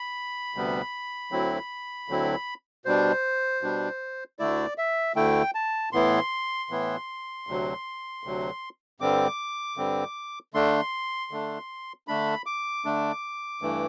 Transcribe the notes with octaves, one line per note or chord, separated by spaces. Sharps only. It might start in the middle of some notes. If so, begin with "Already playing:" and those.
Already playing: B5
D2 C3 G3 B3
D2 D3 F#3 C4 E4
D2 D3 F#3 C4 E4
B2 G3 D4 C5
B2 G3 D4
D2 D3 A3 E4 D5
E5
D2 D3 A3 E4 G5
A5
A2 E3 B3 E4 C6
A2 E3 B3 E4
D2 C3 F#3
D2 C3 F#3
G2 D3 G3 C4 D6
G2 D3 G3 C4
D3 A3 D4 C6
D3 A3 D4
D3 A3 D4 B5
D6
D3 A3 D4
G2 E3 A3